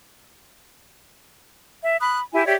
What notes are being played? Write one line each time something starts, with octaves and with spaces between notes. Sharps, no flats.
E5
B5 D#6 F#6
E4 G4 G#5
G4 C#5 D5 E5